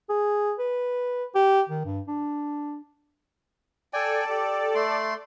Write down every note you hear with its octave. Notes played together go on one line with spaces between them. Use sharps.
G#4
B4
G4
D#3
G2
D4
A4 D5 G5 G#5
G4
A3 C6